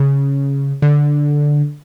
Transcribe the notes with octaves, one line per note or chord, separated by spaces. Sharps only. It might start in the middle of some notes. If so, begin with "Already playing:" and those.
Already playing: C#3
D3